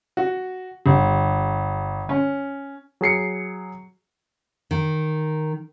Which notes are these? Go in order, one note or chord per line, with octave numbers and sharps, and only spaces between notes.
F#4
G1
C#4
F#3 G#4 C7 C#7
D#3